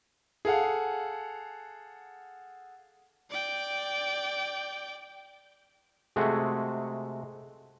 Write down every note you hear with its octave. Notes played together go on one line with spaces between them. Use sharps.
G#4 A4 F5 F#5
D5 G5
C3 G#3 A3 F#4 G#4